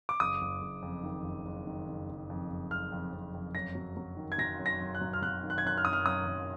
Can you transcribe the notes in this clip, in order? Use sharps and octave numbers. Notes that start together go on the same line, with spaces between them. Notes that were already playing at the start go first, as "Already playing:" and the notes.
D6
F#1 D#6
F#1
F#1
F2
D#3
F#1
F#1
D#3
F#1
F#1
F2
F#1
F#1 F6
F2
F2
F2
F#2 A#6
F#3
F#3
D#3
G#6
F#3 A#6
F#2
A#6
F#2
F#6
F#3
F6
F#3 F#6
D#3
F#6
G#6
F#2 F#6
F6
F#2 D#6
F6
F#2 D#6
F#2